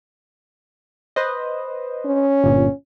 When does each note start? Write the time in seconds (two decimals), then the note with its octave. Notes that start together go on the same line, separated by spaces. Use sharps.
1.16 B4 C5 D#5
2.05 C#4
2.44 G1 A#2